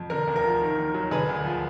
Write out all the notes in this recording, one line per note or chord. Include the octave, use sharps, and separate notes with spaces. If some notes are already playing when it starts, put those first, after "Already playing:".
Already playing: F2
D3 A#4
D2
A#4
F3
D#3
D#2
F#3
D3 G#4 B4
D2
F3